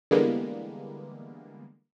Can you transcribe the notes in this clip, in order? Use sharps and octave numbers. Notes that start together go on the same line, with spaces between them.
D3 E3 G3 G#3 A#3 B3